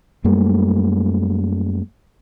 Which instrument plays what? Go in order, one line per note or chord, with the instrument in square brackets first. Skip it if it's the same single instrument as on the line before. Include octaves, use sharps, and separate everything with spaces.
[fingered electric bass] F#2 G3 A3 A#3